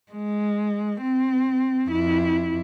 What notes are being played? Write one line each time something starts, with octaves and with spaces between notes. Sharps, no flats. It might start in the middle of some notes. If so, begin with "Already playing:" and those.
G#3
C4
F2 E4